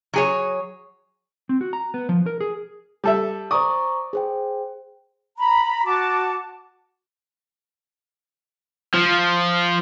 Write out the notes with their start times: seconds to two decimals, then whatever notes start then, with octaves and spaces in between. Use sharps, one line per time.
0.14 F#3 G#4 C#5
1.49 C4
1.61 F#4
1.73 A#5
1.94 B3
2.09 F3
2.26 A#4
2.41 G#4
3.04 G3 A4 E5
3.51 C5 D5 A#5 C#6 D#6
4.13 G#4 C5 G5
5.38 A#5 B5
5.85 F#4 A5 D6
8.94 F3